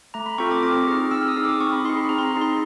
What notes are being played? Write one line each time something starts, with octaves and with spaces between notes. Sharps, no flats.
A3 A#5
B5
C4 F4 A4 C#6
D6
C4 D6
D#4 G#4 F6
F6
C4 E6
D#6
D#4 G#4
D6
C4 C#6
B5
D#4 G#4 C6
B5
C4 A#5
C6
B5
D#4 G#4
C6